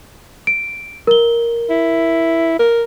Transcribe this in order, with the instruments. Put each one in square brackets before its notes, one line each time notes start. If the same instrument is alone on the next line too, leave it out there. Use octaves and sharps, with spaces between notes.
[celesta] D7
A#4 G7
[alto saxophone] E4
A#4